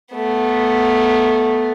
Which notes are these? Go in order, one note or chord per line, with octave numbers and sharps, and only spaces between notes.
A3 B3